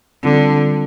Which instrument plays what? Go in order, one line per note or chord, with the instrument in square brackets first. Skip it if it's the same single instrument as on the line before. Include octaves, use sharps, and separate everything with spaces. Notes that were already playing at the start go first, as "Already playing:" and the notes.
[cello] D3 [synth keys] G3 C4 F4